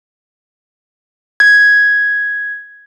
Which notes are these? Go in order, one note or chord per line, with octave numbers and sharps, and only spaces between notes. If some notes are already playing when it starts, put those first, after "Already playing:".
G#6